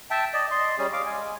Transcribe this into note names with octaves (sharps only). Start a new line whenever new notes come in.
E5 G5 A5
D5 D#5
D5 D#5 C6
G3 C#4 G#4
F5 D6
G#3 G#5